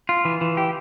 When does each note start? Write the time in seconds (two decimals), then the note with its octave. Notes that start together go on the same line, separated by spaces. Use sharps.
0.09 F4
0.25 E3
0.41 E3
0.57 G4